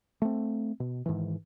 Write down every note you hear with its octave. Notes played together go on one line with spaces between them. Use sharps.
A3 C4
B2
G#2 D#3 E3